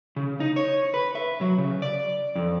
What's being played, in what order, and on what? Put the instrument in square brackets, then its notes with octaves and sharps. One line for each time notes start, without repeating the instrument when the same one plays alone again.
[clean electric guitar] C#3
D#4
C#5
B4
E5
F#3
C#3
D5
F2